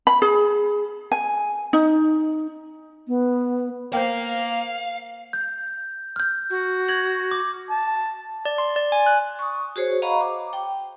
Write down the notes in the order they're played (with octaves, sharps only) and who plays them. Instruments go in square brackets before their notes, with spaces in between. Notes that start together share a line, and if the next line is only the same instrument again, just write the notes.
[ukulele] B5
G#4
G#5
D#4
[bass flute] B3
[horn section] A#3 [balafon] C5 G5 [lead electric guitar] F5
[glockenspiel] G6
F6 G6
[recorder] F#4
[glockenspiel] G#6 A#6 F#7
D6
[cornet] A5
[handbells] D5
C6
D5
G#5
F#6
[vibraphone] C#6 D#6
F#4 G#4 C5 C#5
D#5 F5 F#5 A#5 B5 C#6
D6
G5